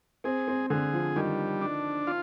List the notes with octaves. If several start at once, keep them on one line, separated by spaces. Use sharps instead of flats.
C4 G#4
C4
D3 G#4
F3
D#3 G3
D4
F4